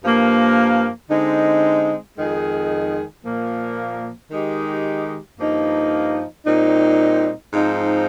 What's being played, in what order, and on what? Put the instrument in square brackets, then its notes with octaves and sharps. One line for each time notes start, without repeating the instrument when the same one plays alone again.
[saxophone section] G2 F3 A#3
D3 G#3 C4 D#4
F2 D#3 G#3 D#4 G#4
A#2 F3 A#3
D#3 G#3 D#4 G4
G2 F3 A#3 D#4
A#2 G3 C4 D#4
G#2 F3 C4 D#4